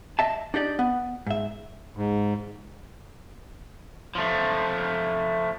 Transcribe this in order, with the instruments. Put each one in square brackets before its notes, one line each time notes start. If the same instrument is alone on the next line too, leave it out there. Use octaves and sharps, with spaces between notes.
[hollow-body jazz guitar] D#5 E5 A5
D4 D#4 G4 D5
B3
G#2 E5
[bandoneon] G#2
[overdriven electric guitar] F3 A3